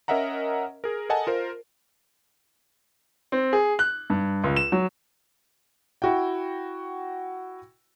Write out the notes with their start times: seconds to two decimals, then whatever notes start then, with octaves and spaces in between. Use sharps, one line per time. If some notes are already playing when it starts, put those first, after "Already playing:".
0.08 C#4 A#4 D#5 E5 F#5 A#5
0.84 G#4 A#4
1.09 A4 A#4 D#5 F#5 G#5 A5
1.27 F4 A#4 C5
3.32 C4
3.53 G#4
3.79 F#6
4.10 G2
4.44 C#2
4.56 E7
4.72 F#3
6.02 E4 F#4 G5